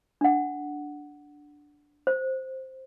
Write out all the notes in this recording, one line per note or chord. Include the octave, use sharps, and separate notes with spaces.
D4 F#5
C5